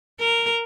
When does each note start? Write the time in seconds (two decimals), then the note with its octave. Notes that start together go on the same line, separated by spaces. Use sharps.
0.20 A#4